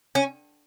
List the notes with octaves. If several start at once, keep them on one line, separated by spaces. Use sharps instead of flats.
C#4